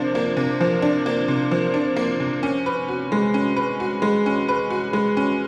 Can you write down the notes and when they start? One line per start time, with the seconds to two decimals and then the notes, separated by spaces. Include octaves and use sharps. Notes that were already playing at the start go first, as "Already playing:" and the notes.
Already playing: C3 F3 A#3 D4
0.15 A#3
0.37 C3
0.60 F3
0.82 D4
1.06 A#3
1.28 C3
1.51 F3
1.74 D4
1.96 A#3
2.20 C3
2.43 C#4
2.66 B4
2.88 F#4
3.12 G#3
3.34 C#4
3.56 B4
3.80 F#4
4.02 G#3
4.26 C#4
4.48 B4
4.70 F#4
4.93 G#3
5.17 C#4